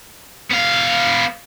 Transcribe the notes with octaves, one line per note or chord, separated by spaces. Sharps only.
B3 F5